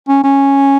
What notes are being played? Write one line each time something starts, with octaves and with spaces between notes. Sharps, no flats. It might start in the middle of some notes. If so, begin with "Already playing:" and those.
C#4
C#4